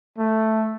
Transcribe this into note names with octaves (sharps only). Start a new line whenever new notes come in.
A3